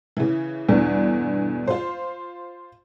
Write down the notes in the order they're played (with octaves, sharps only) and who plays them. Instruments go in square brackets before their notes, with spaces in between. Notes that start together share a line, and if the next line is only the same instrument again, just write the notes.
[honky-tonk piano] C#3 E3
E2 G2 B2 D3
F4 C5